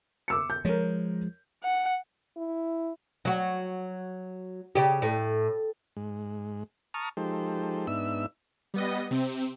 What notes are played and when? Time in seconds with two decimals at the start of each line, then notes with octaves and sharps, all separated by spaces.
0.28 D6 E6 C#7
0.50 G6
0.65 F3 G#3 A#4 C#5
1.64 F#5
2.37 E4
3.25 F#3 F#4
4.75 C#3 G4
5.02 A2
5.97 G#2 G#3
6.94 A5 A#5 C#6 D#6 F6
7.17 F3 G#3 D#4 G4 A4 C5
7.87 G#2 B3 D4 D#4 E5 E6
8.74 G3 B3 D#5
9.11 C3 C4